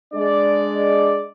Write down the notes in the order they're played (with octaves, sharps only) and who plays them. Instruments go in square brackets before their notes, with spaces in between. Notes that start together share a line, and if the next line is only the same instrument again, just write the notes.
[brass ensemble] G#3 D4 D5